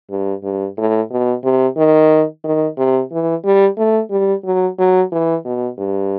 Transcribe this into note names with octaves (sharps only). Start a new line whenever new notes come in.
G2
G2
A2
B2
C3
D#3
D#3
C3
E3
G3
A3
G3
F#3
F#3
E3
B2
G2